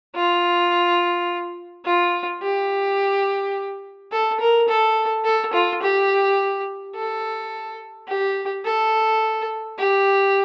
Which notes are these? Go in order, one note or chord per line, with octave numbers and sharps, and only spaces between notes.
F4
F4
G4
A4
A#4
A4
A4
F4
G4
A4
G4
A4
G4